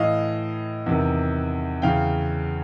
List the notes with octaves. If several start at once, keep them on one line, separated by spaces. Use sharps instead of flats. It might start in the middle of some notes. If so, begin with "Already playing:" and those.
Already playing: A2 E3 D#5 F5
E2 C3 D#3
E2 C#3 E3 F5 G5